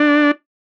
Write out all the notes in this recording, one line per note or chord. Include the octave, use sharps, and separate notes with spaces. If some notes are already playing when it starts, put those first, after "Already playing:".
Already playing: D4